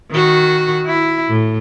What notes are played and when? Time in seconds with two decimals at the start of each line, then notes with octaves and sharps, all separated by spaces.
0.11 D#3 F#4
0.86 E4
1.29 A2